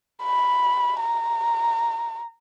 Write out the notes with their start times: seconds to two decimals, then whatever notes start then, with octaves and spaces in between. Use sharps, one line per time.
0.23 B5
1.01 A#5